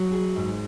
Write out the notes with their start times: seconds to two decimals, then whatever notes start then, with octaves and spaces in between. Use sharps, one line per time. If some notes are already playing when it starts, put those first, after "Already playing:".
Already playing: F#3
0.12 G#4
0.36 G#2